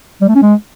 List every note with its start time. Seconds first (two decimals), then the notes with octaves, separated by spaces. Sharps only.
0.21 G3
0.28 A3
0.35 C#4
0.42 G#3